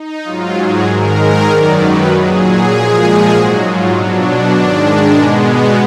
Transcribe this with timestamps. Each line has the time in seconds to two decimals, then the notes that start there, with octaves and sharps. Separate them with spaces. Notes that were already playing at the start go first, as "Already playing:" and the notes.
Already playing: D#4
0.24 G#2 F#3 F4
0.54 G#4
0.85 G#2 D#3 G#3 A#4
1.46 F#2 D#3 F#3 D5
1.77 B4
2.08 A#2 F#3 G#4
2.69 A#2 F3 G#3
3.30 G#2 F#3 F#4
3.61 F4
3.91 B2 F#3 D4
4.53 G#2 D#3 G#3
5.14 B2 G#3 B3